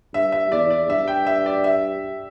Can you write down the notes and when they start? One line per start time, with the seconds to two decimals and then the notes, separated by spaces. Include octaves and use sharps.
0.14 G2 E5
0.32 E5
0.51 E2 D5
0.70 D5
0.89 G2 E5
1.08 G5
1.27 E5
1.46 D5
1.64 E5